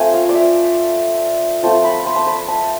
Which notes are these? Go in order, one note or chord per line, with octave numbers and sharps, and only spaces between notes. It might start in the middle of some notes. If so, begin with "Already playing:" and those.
Already playing: A3 C4 F4 G#5
F5
D5
E5
F3 A3 C4 F4 A5
B5
C6
A5
B5
A5